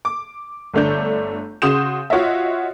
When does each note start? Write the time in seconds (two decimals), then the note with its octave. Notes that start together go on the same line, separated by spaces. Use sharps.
0.05 D6
0.74 G1 D3 A3 D4 G6
1.62 C#3 F#4 C6 D#6 G6 E7
2.10 F4 F#4 C#5 D#5 E5